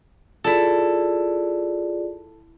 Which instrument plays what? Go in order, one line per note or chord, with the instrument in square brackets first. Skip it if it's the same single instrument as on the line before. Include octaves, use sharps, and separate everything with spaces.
[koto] E4 A4 [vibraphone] F4 G#4 D5